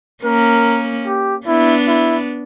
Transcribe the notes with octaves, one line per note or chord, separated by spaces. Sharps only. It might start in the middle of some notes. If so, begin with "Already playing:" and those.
A#3 C#4 A#4
G4
B3 D4 E4
E4